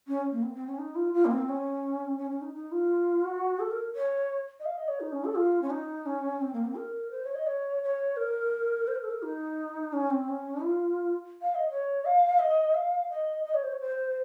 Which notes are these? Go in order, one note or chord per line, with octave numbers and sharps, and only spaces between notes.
C#4
A#3
C4
C4
C#4
D#4
F4
F4
A#3
C4
C#4
C#4
C#4
D#4
D#4
F4
F#4
A4
A#4
C#5
D#5
F5
D#5
C#5
D#4
C#4
A4
F4
C#4
D#4
C#4
C4
A#3
C4
A#4
C5
C#5
D#5
C#5
C#5
A#4
C5
A#4
A4
A#4
D#4
C#4
C4
C#4
F4
F5
D#5
C#5
F5
D#5
F5
D#5
D#5
C#5
C5
C#5
C5